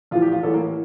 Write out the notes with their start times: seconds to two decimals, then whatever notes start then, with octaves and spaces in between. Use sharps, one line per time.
0.11 A#1 A2 E3 F4
0.22 G4
0.32 F4
0.43 A1 A2 E3 A4
0.54 A#3